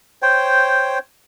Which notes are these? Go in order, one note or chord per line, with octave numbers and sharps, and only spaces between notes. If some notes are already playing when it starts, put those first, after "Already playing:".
C5 C#5 G5